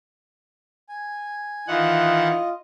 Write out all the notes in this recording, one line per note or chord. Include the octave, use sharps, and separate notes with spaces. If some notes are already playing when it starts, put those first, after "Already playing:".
G#5
D#3 E3 F4 D#5 F#5